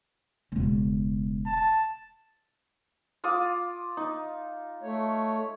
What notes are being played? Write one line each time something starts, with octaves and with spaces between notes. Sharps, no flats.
E1 C#3
A5
F4 D6 D#6
D#4
A3 C#5